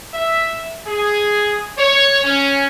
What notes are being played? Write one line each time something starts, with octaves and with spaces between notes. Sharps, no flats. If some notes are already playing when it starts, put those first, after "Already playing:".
E5
G#4
C#5
C#4